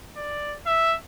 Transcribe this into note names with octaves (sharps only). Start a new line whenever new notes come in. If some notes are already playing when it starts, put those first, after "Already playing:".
D5
E5